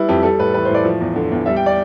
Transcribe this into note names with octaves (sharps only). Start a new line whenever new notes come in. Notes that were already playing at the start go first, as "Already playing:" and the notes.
Already playing: G3 E4 B4
F2 G4
G3 A4
A2 B4
E3 B4
C5
A2
D5
F3
E2
D3
E2
G3 E5
G5
D5